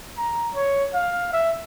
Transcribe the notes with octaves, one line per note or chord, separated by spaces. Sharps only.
A#5
C#5
F5
E5